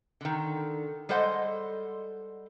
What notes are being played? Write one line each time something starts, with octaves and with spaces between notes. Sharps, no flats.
D3 D#3
G3 G#3 A4 C5 D#5 F#5